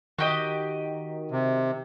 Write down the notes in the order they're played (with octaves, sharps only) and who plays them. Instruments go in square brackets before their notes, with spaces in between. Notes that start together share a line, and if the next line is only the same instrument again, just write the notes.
[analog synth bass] D#3 [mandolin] F#4 G4 D#5
[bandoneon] C3